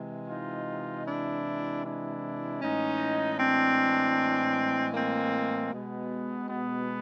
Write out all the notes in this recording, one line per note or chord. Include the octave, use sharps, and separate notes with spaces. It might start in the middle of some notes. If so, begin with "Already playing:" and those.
Already playing: C3 E3 G#3
D#4 F4
D4 E4
D4 E4
A2 E3 G#3 C#4 D#4
C4 D4
A#3 C4
B2 G#3 B3
B3